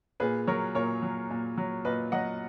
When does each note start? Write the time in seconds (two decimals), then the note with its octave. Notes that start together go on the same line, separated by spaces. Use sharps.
0.20 A#2 G#4 B4
0.47 F#3 A#4 C#5
0.75 A#2 A#4 C#5
1.03 F#3
1.30 A#2
1.57 F#3
1.85 A#2 B4 D#5
2.12 F#3 D#5 F#5